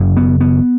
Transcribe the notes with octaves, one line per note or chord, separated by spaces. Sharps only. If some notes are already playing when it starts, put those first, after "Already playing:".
Already playing: F#1 F#2 C#3
B3
B3